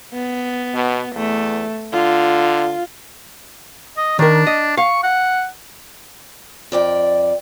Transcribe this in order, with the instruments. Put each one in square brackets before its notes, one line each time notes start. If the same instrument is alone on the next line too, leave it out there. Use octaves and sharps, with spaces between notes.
[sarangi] B3
[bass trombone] B2
[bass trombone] E2 [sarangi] A3
[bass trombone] D3 [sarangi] F4
[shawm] D#5
[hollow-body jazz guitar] D#3 A#4 [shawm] D4
[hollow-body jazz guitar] D#5
[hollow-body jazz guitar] F5 [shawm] C#6
[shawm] F#5
[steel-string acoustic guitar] F2 D5 G5